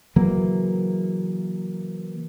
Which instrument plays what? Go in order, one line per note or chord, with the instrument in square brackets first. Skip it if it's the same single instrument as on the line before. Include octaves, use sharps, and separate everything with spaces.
[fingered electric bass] C#3 E3 F#3 A#3